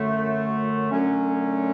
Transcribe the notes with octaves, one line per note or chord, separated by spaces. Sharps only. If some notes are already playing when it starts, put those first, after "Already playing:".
Already playing: F#2 D3 A3
F#2 D3 F#3 A3 C#4